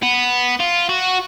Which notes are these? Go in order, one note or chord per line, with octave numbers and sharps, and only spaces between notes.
B3
F4
F#4